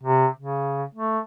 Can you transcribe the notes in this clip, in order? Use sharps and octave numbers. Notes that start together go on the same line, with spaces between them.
C3
C#3
A3